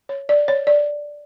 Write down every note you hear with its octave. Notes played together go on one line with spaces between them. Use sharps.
C#5
D5
C#5
D5